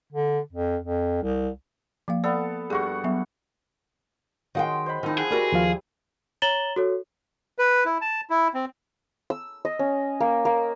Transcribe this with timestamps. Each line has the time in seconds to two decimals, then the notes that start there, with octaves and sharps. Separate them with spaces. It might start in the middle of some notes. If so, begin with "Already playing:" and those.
0.12 D3
0.52 F2
0.82 F2
1.23 C2
2.08 F3 A#3 F5
2.24 B3 A4 D5 F5
2.70 G2 F#4 G#4 C#6
3.04 F#3 B3 E5
4.55 D#3 F#3 G#3 F#5 G5 C6
4.86 C5 D#5 B5
5.03 D#3 F3 C4 D#4 E4
5.18 G#4 F#5
5.31 G3 F#4 A#4 B4 A5
5.52 D#2 F3 F5
6.42 C#5 A#5 A6 E7 F#7 G7
6.76 F#4 A4 C#5
7.58 B4
7.85 E4
8.01 A5
8.30 E4
8.54 C4
9.30 E6
9.65 D#5
9.79 C#4
10.20 A#3
10.45 A#3